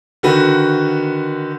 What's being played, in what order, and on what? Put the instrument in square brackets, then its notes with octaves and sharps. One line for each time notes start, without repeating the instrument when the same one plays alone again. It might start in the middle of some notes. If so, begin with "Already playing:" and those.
[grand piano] D3 D#3 F#4 B4